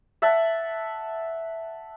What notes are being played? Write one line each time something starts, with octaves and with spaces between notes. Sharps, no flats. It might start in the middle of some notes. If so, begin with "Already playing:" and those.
E5 F#5 A5